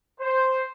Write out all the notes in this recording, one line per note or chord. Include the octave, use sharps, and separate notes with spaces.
C5